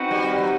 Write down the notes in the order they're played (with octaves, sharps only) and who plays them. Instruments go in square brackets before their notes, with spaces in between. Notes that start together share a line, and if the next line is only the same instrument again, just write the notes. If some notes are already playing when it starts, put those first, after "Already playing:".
Already playing: [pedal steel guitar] C4 D#4 F#4 B4
[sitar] G3
F#3